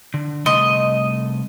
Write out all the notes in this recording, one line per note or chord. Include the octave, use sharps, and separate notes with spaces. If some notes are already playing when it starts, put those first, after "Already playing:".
D3
C2 A3 D#5 C6